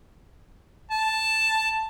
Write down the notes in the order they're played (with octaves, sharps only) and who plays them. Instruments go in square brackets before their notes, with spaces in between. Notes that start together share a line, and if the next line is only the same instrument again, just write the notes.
[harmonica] A5